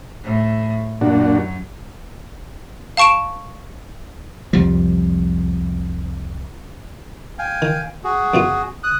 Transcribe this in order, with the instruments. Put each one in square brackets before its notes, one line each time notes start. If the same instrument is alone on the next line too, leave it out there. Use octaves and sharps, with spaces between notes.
[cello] A2
[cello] F#2 [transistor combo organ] A#2 D4 F#4
[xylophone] F5 A5 C#6 D7 E7
[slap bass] C2 F2 F3 G3
[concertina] F5 G5 G#5
[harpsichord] D#3
[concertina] F#4 G#4
[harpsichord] F#2 B2 F4
[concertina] D#6 F#6